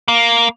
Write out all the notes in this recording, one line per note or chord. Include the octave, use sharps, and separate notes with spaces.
A#3